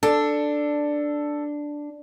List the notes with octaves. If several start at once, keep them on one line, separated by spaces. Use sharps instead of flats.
D4 A4